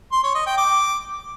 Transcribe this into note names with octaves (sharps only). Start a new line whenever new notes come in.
C6
C#5
D#5
G5
D6